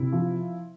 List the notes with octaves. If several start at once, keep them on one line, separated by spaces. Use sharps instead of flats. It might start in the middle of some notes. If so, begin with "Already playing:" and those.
Already playing: C3 E4
F3